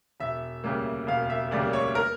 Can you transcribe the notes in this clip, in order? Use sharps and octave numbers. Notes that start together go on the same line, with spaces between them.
E1 E5
D2 C#3 G3 A#3
E1 F5
E5
D2 C#3 G3 A#3 D5
C#5
A#4